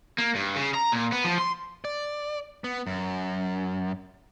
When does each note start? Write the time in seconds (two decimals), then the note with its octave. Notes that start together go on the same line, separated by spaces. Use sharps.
0.18 A#3
0.35 G2
0.56 C#3
0.74 A#5
0.92 A#2
1.12 B3
1.24 F3
1.38 C6
1.85 D5
2.64 B3
2.87 F#2